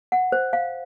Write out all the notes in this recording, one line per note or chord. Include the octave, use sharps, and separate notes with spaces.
F#5
C5
F5